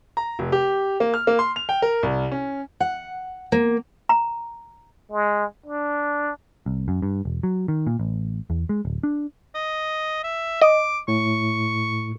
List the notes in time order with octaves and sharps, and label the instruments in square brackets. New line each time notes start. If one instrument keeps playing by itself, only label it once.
[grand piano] A#5
F1
G4
A#3
F6
A#3
C6
F7
G5
A#4
C2
C#4
[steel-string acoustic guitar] F#5
A#3
[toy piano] A#5
[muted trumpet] G#3
D4
[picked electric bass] C2
F#2
G2
E1
F#3
D#3
A#2
A1
E2
G#3
D1
D4
[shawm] D#5
E5
[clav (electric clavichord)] D#5 [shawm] D6
[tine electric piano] A2 [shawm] C#6